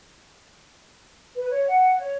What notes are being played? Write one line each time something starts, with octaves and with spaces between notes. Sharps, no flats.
B4
C#5
F#5
C#5